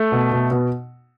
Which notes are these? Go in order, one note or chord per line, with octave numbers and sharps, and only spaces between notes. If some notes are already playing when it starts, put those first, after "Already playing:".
Already playing: A3
B2
B2
B2